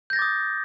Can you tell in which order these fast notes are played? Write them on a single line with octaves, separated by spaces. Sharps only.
G6 A#6 A6 D6 D#6